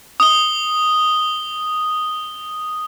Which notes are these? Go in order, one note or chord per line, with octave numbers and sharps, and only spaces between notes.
D#6 G7